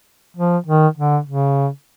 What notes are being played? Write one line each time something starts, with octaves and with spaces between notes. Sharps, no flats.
F3
D#3
D3
C#3